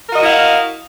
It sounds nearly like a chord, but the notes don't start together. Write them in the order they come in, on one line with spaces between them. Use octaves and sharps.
A#4 F#4 D#5 E4 F5